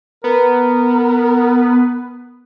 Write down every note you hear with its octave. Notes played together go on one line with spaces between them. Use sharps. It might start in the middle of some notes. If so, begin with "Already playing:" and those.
B3 A#4